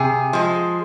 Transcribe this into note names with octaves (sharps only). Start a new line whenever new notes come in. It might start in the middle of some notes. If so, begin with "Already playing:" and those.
Already playing: C3 G#4
F3 G#3